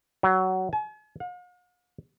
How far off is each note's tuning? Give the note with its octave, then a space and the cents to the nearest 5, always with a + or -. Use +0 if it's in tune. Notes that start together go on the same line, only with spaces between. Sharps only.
F#3 +15
G#5 +45
F5 +45